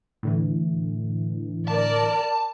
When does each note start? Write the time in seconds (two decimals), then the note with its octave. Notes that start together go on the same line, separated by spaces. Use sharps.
0.23 A2 D3 E3
1.68 A#4 D5 A5